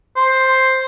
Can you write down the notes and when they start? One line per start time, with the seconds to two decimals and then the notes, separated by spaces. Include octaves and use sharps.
0.16 C5